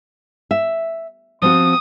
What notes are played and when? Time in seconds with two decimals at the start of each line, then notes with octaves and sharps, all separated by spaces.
0.51 E5
1.42 F3 C4 F#4 D#6